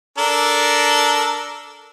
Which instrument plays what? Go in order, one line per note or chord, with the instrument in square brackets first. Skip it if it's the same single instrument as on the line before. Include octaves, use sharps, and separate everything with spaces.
[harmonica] D4 A4 A#4